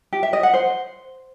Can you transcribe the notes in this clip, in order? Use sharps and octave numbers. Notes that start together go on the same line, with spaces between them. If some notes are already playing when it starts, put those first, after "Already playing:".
G4
E5
D#5
F#5
C5